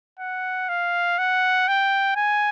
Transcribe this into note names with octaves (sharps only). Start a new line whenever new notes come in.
F#5
F5
F#5
G5
G#5